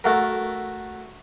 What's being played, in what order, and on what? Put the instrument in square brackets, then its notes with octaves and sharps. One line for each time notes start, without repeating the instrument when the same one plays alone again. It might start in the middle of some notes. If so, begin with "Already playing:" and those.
[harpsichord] A3 F#4 A#4